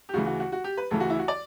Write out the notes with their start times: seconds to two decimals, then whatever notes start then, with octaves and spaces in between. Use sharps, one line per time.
0.09 G4
0.14 D2 C#3 E3 F#4
0.26 F#4
0.40 F#4
0.52 F#4
0.64 G4
0.77 B4
0.91 D2 C#3 E3 A4
1.00 F#4
1.10 E4
1.19 F#4
1.28 D5